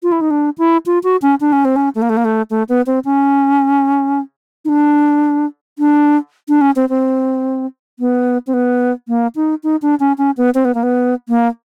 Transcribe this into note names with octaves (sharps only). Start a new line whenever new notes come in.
F4
E4
D#4
D4
E4
F4
F#4
C#4
D4
C#4
C4
C#4
A3
A#3
A3
A#3
A3
A3
B3
C4
C#4
D#4
D4
D4
D4
C#4
C4
C4
B3
C4
B3
A#3
D#4
D#4
D4
C#4
C#4
B3
C4
B3
A#3
B3
A#3